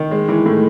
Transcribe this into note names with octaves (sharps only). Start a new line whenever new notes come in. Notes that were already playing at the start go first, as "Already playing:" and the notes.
Already playing: D#3
G#3
E3
A2